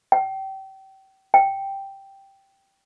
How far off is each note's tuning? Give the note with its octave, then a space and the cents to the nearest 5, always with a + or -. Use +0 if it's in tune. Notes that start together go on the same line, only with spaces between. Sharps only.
G5 -30
G5 +0